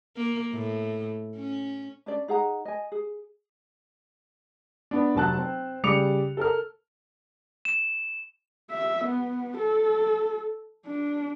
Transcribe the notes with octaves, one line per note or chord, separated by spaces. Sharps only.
A#3
A2
C#4
C#4 D4 D5
D#4 G#4 F#5 A#5
D#5 G#5
G#4
B3 D4
F1 F#3 A5 F#6
C4
C#3 G3 G4 D6 C#7 F7
A4 A#4 F6
E7
E5
B3
A4
D4